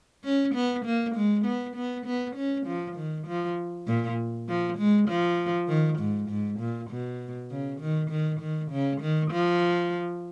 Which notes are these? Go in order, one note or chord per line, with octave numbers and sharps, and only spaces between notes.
C#4
B3
A#3
G#3
B3
B3
B3
C#4
F3
D#3
F3
A#2
F3
G#3
F3
D#3
G#2
G#2
A#2
B2
C#3
D#3
D#3
D#3
C#3
D#3
F3